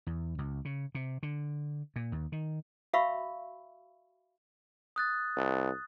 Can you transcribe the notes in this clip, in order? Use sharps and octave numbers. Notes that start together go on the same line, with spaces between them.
E2
C#2
C#3
C3
D3
A#2
D#2
D#3
F#4 E5 F5 B5 C#6 E6
D#6 F#6 A6
C2